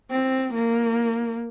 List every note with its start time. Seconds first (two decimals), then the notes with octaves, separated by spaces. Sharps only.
0.10 C4
0.54 A#3